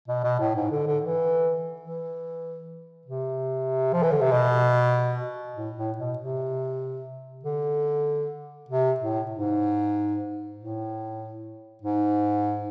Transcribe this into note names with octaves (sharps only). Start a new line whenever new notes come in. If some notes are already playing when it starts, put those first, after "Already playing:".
B2
B2
A2
G#2
D3
D3
E3
E3
C3
F3
E3
D3
C3
B2
A2
A2
B2
C3
D3
C3
A2
G#2
A2
G#2